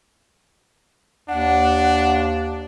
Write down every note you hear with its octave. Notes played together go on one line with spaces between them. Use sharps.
D#2 D4 F#5